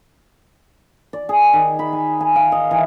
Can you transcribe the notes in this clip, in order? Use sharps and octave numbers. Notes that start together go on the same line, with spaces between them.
D5
G#4
D#3
B5
G#5
G#5
F5
D#5
E3